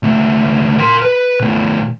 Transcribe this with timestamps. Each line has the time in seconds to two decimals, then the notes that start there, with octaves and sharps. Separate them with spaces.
0.03 C#2 A3
0.79 A#4 C6
1.02 B4
1.40 B2 A3